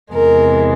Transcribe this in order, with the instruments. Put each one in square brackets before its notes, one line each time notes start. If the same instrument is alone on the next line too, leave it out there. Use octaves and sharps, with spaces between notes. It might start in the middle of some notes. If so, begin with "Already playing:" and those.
[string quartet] E2 C3 E3 G#3 A#4